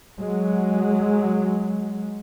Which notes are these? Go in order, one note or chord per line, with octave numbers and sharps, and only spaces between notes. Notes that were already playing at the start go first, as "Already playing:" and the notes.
F#3 G#3